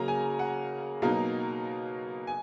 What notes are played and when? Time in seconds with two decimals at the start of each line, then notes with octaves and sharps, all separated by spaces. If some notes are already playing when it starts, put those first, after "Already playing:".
Already playing: C#3 F#3 A#3 C#4 A#5
0.08 G#5
0.39 F#5
1.02 B2 F#3 A#3 D#4 F5
2.27 G#5